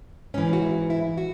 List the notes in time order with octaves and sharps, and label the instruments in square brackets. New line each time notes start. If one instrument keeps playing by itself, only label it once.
[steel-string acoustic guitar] G#2 C#4
E3
F#4
E4
E4
F#4